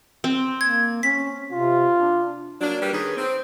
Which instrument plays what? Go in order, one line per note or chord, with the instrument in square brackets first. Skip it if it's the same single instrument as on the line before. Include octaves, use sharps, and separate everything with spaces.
[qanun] C4
[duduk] A#3 [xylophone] G#6
[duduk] C#4 [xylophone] B6
[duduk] C3 [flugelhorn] F4
[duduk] D4
[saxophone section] F#3 A#3 D4
G3 A#3 G4 B4
D#3 C#4 G#4 B4
C4